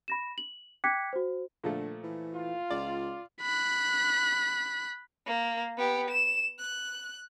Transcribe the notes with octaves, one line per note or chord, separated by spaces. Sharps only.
B5 A#6 E7
F#7
G5 D6 F#6 G#6 B6 C#7
F#4 C5
A#2 D3 F3 A3
E3
F4
C#2 D5
B5 F#6
A#3
B3 G4
E7
F#6